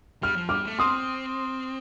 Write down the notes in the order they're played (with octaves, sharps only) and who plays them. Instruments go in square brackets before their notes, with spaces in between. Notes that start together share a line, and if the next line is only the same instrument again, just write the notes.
[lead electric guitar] G3 [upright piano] F6
[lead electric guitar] F3
[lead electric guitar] G3 [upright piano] D6 F6
[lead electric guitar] A3
[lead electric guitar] C4 [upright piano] C6 D#6